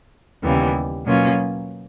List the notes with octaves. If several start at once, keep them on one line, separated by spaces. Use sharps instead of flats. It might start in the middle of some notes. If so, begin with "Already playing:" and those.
D#2 C#3 E3 G3 B3
B2 F#3 A#3 C#4 F4